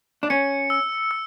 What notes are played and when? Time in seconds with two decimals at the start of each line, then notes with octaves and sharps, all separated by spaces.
0.23 D4
0.30 C#4 C#7
0.70 E6
1.11 E6